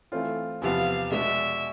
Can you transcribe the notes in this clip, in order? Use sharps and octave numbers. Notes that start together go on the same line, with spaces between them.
E3 A3 C4 F4
E2 C3 F3 B3 F5
B2 G#3 D4 E5